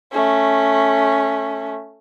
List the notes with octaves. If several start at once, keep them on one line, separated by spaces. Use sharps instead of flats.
A3 C#4